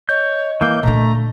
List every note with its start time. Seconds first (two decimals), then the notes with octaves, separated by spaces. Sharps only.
0.09 C#5 D#5 G6
0.61 E3 A#3 G6
0.83 A#2 D3 A3 A#5